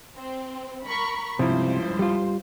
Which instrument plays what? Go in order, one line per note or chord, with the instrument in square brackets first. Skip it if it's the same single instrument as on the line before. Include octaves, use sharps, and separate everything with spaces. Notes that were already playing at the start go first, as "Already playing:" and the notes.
[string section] C4
A#4 B5 C#6
[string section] C#2 G2 C5 [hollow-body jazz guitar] C3 [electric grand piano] F3 E4
[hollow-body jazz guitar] G3 F4